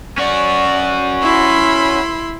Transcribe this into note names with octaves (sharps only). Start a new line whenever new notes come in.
C#4 F#4 D5
E4 B5 C6